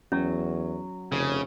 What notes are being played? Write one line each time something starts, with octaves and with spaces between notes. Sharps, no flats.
E2 F#3 C#4
F1 C#3